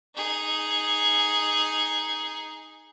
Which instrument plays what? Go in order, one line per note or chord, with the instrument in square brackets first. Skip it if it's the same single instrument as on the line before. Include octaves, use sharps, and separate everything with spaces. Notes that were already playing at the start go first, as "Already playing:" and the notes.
[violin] D#4 G#4